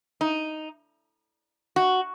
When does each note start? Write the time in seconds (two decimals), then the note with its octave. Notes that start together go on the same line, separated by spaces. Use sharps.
0.21 D#4
1.76 F#4